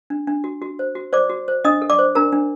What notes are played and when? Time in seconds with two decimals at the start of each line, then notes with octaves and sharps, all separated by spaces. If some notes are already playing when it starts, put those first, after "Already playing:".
0.10 D4
0.27 D4
0.44 F#4
0.62 F#4
0.79 C5
0.95 F#4
1.13 C5 D5 D6
1.30 F#4
1.48 C5
1.64 D4 D#5 D#6
1.82 A4
1.90 D5 D6
1.99 C5
2.15 D4 A#4 A#5
2.32 D4